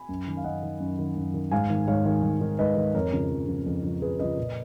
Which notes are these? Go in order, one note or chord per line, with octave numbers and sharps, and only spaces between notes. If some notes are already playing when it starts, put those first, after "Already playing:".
Already playing: G#5 B5
F#2
D#3
F5
F#2 D#5 F#5
D#3
F#2
D#3
F#2
D#3
G#2 F5 G#5
D#3
G#2 C#5 F5
D#3
G#2
D#3
G#2 B4 D#5
D#3
F2 A#4 C#5
C#3 F3
F2
C#3 F3
F2
C#3 F3
F2 G#4 B4
C#3 F3 B4 D#5
A#2